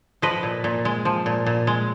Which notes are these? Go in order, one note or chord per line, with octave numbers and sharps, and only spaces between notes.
F3 B4 D#5
A#2
A#2
G#3
F3
A#2
A#2
G#3